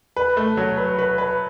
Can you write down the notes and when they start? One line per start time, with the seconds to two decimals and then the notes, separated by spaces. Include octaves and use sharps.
0.17 B4
0.37 A3
0.57 F#3
0.77 B4
0.99 B4
1.18 B4